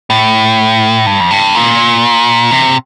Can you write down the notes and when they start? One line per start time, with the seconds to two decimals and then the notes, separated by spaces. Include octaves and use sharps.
0.10 A2
1.06 G2
1.20 F2
1.31 G2
1.55 A#2
2.51 C3